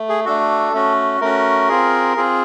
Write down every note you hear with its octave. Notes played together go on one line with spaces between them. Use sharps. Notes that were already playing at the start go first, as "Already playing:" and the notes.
Already playing: A3
G#4
A3 D4 F#4 A4
A3 C#4 F#4
A3 C#4 F#4 A#4
C4 F4 G#4
C4 F4 G#4